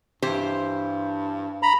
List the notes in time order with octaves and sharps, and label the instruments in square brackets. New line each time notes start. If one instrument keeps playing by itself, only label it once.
[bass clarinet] G2 [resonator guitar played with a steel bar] E3 G4 C5
[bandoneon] A#5 B5